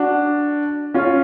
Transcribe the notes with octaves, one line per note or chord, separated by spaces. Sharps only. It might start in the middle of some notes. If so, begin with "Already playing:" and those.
Already playing: D4 F#4
C#4 F4